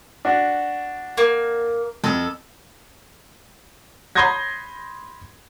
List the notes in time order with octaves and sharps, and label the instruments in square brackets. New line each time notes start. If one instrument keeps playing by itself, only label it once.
[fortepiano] D4 F#4
[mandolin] A#3
[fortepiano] F2 E6 [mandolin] A4
[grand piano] B5 C6 D#6 G6 G#6 A#6